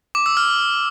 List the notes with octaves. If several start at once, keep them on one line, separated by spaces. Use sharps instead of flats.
D6
E6
F6